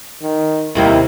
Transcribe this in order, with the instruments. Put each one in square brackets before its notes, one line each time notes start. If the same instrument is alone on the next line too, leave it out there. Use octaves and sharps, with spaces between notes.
[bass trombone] D#3
[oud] D#2 C3 A#3 [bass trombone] E4